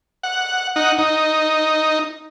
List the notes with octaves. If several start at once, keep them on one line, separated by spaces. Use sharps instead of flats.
F#5
D#4 F#5
D#4